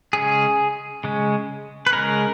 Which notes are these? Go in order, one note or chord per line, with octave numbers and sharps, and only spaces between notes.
C#3 G#3 C#4 G#4
C#3 G#3 C#4
B4
C#3 G#3 C#4 A#4